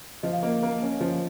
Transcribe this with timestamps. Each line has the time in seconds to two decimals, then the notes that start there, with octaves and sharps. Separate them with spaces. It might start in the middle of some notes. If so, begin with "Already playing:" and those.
0.23 F3 D#5
0.33 F5
0.43 A#3 D#5
0.63 A#3
0.82 C#4
1.01 F3